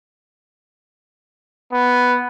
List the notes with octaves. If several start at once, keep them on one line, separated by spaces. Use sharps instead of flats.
B3